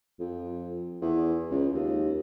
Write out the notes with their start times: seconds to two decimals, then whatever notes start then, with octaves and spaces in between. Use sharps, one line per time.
0.19 F2
1.02 E2
1.51 C#2
1.73 D#2